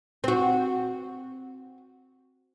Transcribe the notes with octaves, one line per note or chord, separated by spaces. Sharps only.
C4 F#4